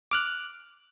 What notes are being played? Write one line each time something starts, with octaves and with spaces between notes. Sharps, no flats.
D6 F6 F#6